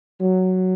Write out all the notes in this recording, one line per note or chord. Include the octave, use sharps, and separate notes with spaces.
F#3